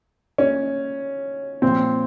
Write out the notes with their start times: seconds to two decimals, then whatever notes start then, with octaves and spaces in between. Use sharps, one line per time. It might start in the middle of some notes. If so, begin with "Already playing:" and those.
0.38 C#4
1.62 A#2 F3 C4